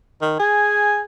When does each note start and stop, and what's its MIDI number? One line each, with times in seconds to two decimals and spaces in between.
0.22 0.35 51
0.39 1.04 68
0.39 1.02 80